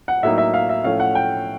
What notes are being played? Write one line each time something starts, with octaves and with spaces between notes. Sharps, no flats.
F#5
A2 F#3 A#3 D#4 E5
E5
F5
E5
A2 F3 A3 C#4 F5
F#5
G5